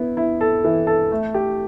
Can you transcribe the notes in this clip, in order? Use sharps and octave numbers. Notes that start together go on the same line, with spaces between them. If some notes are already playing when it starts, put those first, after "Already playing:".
Already playing: B3 E4
E4
A4
E3
A4
A3
G4